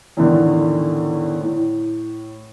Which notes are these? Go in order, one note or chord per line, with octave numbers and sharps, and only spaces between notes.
E2 A2 D3 D#3
A2